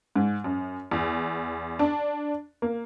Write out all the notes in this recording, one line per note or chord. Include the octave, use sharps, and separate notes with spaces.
G#2
F#2
E2
D4
A#3